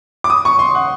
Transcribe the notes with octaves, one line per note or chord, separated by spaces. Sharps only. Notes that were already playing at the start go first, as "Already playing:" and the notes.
D6
D#6
C#6
C6
F#5